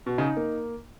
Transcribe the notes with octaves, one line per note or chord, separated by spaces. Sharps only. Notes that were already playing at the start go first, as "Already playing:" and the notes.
B2
C#3 D#4
A#3